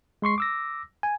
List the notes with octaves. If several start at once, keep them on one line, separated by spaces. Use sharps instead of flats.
G#3 C6 C#6 C7
D6 E6 A#6
G#5